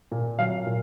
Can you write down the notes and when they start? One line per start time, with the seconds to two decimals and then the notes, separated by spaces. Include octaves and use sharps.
0.12 A#2
0.39 F#3 F5
0.67 A#2